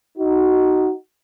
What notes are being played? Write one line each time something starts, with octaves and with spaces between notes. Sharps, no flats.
D#4 F#4